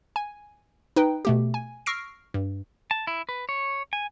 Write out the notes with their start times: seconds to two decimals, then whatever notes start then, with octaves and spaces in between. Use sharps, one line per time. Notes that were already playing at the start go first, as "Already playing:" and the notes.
0.16 G#5
0.96 D#4 B4 G5
1.25 B2 A3 G4
1.54 G#5
1.86 C#6 E6 F6 A#6 C7 D7
2.34 G2
2.91 A5
3.07 E4
3.29 B4
3.49 C#5
3.93 G#5